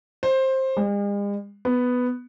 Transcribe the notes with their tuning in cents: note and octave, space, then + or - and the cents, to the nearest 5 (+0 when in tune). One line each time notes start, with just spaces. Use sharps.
C5 +15
G#3 -45
B3 +5